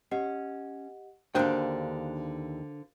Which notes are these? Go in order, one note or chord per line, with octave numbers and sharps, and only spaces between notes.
C#4 G4 D#5 F#5
D#2 D3 D4 F#4 A#4 C5 F5 G5